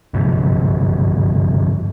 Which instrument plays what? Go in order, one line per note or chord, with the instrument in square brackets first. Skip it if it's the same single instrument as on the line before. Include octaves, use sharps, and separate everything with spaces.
[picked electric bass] G1 G#2 C3 F3